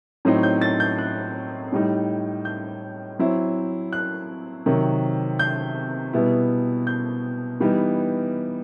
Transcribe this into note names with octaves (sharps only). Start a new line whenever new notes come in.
A2 F#3 C4 D#4
G6
A6
G6
F#6
A2 G3 D#4
G6
F#3 C4 E4
F#6
C3 D#3 F#3
G6
B2 G3 B3 E4
G6
E3 G3 B3 D#4